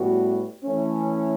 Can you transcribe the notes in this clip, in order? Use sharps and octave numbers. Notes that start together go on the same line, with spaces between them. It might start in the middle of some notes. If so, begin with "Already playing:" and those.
Already playing: A2 G3 B3 F#4
E3 A3 C#4